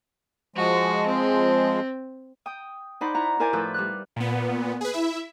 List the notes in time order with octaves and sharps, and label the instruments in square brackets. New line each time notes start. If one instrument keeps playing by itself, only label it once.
[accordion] F3 G#3 [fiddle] F#4
[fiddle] C4
[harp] G5 D#6
D#4 C5 D5 F#5 B5 C6
E4 F#5 A#5
E4 A#4 C5 D5 G#5
A2 F3 B4 E6 G6
G3 F6 F#6
[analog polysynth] A#2 B3
G#4 B4
E4 E5